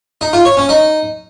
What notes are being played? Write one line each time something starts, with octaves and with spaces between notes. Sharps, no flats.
D#4
F4
C#5
C#4
D#4